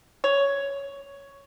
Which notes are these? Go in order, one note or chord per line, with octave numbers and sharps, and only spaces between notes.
C#5